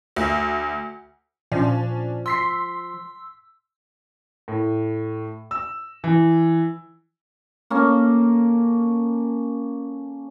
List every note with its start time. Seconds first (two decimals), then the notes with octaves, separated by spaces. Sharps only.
0.16 D2
1.52 A#2 F3 C#4 D4
2.26 C6 E6 B6 C7
4.48 A2
5.51 E6
6.04 E3
7.70 A#3 C#4 A4